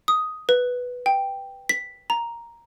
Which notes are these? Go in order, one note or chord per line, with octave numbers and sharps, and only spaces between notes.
D#6
B4
G5
B6
A#5